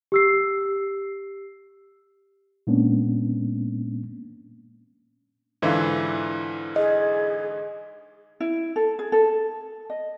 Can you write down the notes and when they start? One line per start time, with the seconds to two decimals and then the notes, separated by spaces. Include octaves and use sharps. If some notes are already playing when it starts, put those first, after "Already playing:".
0.12 G4 E6 C7
2.67 A#2 G#3 A#3 B3 C#4 D4
5.62 G#2 D3 E3 E4 F4
6.76 G#4 D#5
8.40 E4
8.76 A4
8.99 G#4
9.12 A4
9.90 D#5